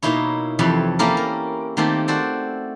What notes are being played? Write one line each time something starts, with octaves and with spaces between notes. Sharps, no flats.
B2 A#3 D#4 E4 C#5
F2 C3 E3 A4 C#5 B5
A#3 C#4 E4 G4 A4 A#4
A#4
D#3 A3 A#3 C4 G4 A4
F#4 A4 C5 D5